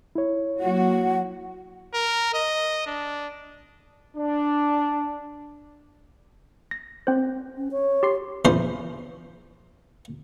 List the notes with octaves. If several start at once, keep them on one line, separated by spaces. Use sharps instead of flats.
E4 C#5
F#3 A#3 F#4 F#5
A#4
D#5
D4
D4
A#6
C4 C5
C#4
C#5
G4 C6 C7
A#1 E2 E3 C5 C6